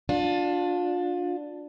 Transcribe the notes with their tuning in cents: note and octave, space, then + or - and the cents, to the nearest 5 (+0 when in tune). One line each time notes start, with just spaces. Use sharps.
D4 +0 F4 +30